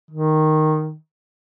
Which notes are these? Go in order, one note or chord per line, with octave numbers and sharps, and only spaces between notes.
D#3